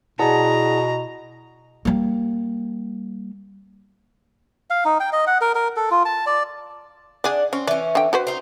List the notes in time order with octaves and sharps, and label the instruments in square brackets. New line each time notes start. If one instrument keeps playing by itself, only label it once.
[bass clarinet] B2 [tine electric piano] E4 D5 F#5 [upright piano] G#4 A5 [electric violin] A#5
[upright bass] G3 A#3
[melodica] F5
D#4
G5
D#5
F#5
A#4
A#4
A4
F4
A5
D5
[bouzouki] D4 F#5 [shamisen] G#4 D5
[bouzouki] C4 [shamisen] C#4
[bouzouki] E3 C#4 [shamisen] D5
[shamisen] D3 G5
F#4 B4 C5
[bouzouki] C4 D#4